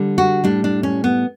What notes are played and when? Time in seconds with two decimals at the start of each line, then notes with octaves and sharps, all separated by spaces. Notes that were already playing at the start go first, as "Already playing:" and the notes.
Already playing: D3 G3
0.18 F#4
0.44 A2 G3 D4
0.64 D4
0.83 C#4
1.04 B3